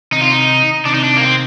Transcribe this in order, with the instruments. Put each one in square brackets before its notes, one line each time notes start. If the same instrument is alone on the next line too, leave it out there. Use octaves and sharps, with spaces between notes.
[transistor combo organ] C3 D#3 [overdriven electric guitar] D#4
[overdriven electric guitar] F4
D#4
[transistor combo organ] C3 D#3 [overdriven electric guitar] D4
[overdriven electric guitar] D#4
D4
A#3
C4